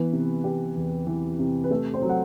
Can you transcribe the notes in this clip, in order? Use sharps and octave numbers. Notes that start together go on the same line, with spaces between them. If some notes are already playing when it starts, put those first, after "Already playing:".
Already playing: E3 B3 B4
C3
B3 G4
E2
E3
C3
B4
A3 A4
C4 C5
F#3
F#5